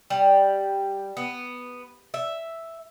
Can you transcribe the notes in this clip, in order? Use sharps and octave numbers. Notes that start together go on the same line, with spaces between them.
G3
B3
E5